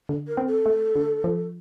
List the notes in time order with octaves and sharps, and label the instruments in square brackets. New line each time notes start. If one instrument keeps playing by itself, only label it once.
[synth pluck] D3
[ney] A#4
[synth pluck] C4
[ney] A4
[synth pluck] A3
D3
F3